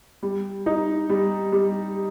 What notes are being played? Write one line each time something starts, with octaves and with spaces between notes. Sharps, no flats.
G3
D#4
G3
G3